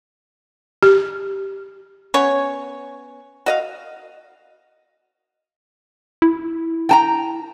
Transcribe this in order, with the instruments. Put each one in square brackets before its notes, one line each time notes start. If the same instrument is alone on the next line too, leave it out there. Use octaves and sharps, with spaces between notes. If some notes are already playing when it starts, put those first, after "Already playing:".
[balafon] G4
[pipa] B3 C#4 C#5
F#4 D#5 F5
[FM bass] E4
[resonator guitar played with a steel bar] G5 A5 A#5